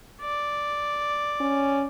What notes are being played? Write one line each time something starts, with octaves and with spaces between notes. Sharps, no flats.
D5
C#4